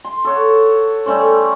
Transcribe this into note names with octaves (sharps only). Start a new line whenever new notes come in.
C6
A4 C#5 F#5
G3 A3 C#4 C5